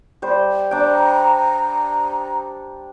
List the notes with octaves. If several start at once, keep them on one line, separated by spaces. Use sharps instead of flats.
G3 C5
D4 G5 A#5